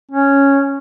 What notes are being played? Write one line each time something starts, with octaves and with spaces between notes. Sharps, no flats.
C#4